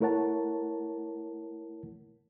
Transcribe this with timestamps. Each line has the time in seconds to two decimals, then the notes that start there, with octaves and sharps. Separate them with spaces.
0.01 A3 E4 A#4 C#5 F#5 A5